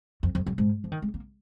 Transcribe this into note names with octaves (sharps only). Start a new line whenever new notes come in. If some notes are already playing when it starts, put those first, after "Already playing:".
F2
F2
F#2
G#2
F3
D#3
G#3
A#3